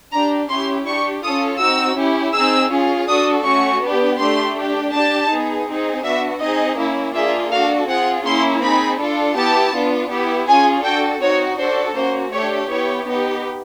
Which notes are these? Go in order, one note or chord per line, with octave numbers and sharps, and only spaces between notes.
D4 G4 A#5
C#4 E4 G4 C6
D4 G4 C#6
C#4 F4 A4 D#6
C4 D#4 F#4 E6
C#4 E4 G4
C4 D#4 G#4 E6
C#4 F4 G#4
D4 F#4 A4 D#6
A3 C#4 F#4 C#6
B3 D4 G4
A3 D4 G4 C6
D4 G4
D4 G4 A5
B3 D#4 G#4
C4 D#4 G#4
B3 D4 F#4 E5
C4 D#4 G#4 D#5
A#3 C#4 E4
A#3 D4 F4 G#4 E5
D4 F#4 A4 F5
C4 F4 G#4 F#5
A#3 C#4 E4 C6
C4 D#4 G#4 B5
D4 F4 A4
B3 E4 G4 A5
B3 D4 F4
B3 E4 G4
C#4 F4 G#4 G#5
D4 F#4 A4 G5
C4 D#4 F#4 C#5
D4 F#4 A4 C5
A#3 C#4 F#4 C5
A3 D4 G4 C#5
B3 E4 G4 C#5
B3 D#4 G4